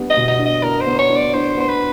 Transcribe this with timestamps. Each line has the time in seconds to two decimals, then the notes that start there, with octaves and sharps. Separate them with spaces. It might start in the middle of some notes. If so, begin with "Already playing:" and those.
Already playing: G3 B3 D4
0.10 D#5
0.17 B2
0.28 D#5
0.39 D4
0.46 D#5
0.63 D4 A#4
0.81 C5
0.86 B3
0.99 C#5
1.10 D4
1.16 D5
1.34 D4 C5
1.57 B3 C5
1.69 B4